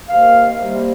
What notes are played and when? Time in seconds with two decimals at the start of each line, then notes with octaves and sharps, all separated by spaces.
0.09 C3 D#3 A#3 F5
0.60 C3 G3 A#3